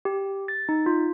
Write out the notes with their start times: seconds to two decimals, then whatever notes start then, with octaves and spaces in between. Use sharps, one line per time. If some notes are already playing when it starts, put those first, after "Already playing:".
0.05 G4
0.48 A6
0.69 D#4
0.86 F4